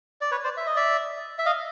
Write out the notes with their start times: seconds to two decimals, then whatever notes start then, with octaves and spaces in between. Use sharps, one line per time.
0.21 D5
0.31 B4 C#5
0.44 C5 D5
0.57 E5
0.67 D#5
0.76 D5 E5
1.38 E5
1.46 D#5 F5